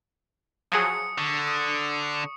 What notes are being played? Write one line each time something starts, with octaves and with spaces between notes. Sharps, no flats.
F3 F#3 G#4 D#6 C#7
D3 C#6
D#6